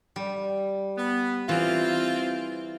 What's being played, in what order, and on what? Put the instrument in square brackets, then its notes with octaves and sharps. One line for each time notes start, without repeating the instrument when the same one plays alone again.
[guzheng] G3
[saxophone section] B3
[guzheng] E3 [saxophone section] C4 F4